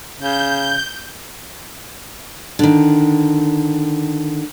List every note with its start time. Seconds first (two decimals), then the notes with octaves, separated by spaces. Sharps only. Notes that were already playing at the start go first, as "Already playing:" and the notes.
0.20 C#3 G6
2.59 D3 D#3